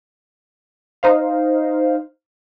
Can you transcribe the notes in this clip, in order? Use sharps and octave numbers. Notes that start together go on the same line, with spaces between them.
D#4 C5 F5